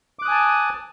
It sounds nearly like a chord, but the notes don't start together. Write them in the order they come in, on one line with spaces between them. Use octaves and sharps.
D6 F#6 D#6 G#5 A5